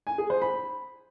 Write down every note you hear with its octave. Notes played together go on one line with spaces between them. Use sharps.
G#5
G#4
C5
B5